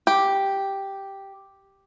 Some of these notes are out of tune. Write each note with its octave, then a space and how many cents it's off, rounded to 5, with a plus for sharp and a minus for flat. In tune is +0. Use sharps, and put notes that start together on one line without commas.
G4 +0